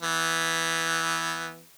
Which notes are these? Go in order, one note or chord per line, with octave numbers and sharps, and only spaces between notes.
E3 B3